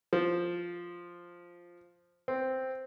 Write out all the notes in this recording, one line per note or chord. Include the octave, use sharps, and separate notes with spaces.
F3
C4